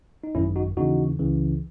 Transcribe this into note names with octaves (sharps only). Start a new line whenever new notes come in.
D#4
G#1 F#2 D#3 C#4 E4
D#4 F#4
D#2 C#3 E3 D#4 F#4
C#2 C#3 E3